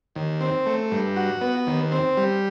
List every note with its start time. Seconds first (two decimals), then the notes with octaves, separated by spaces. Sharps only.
0.15 D#2
0.41 C4
0.66 A3
0.91 G2
1.16 F#4
1.41 B3
1.67 D#2
1.92 C4
2.17 G3